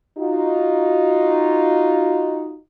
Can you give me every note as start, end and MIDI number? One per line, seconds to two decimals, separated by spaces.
0.18 2.57 63
0.18 2.57 65
0.18 2.57 66